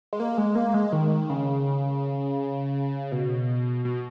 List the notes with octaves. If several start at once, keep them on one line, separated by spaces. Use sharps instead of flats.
G#3
A#3
G#3
A#3
G#3
D#3
C#3
B2
B2